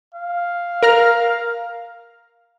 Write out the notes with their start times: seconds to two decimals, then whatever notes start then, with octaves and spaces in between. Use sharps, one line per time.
0.14 F5
0.83 A#4 A#5 F6